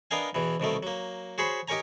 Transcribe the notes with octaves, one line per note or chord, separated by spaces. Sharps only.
B3 D4 A#4 D#5 F5 G#5
E2 B2 E3
C2 B2 D#3 A3
F#3 A#3
F#4 G#4 C5 C#5 B5
D#4 G4 A#4 C#5 G#5 A#5